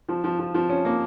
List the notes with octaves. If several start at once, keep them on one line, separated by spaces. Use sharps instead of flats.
F3
F3
F3
F3
C#4
A#3